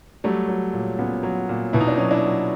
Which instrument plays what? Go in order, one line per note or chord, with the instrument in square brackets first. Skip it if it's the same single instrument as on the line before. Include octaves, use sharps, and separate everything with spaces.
[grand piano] F#3 G3 A3
F#3
A#2
A#2 B3 C#4
F#3
A#2
B2 E4
D#4
D4
F#3 C#4 D#4
D4 E4
F#3